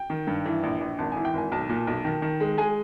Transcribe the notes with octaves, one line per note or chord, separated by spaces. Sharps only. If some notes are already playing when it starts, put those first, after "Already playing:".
Already playing: G5
D#3
G2
E3
A#1
A#1
G#1 A5
G#5
E3
G5
G#1 G#5
B1 A5
A#2
B1
D#3
D#3
G#3
G#3 G#5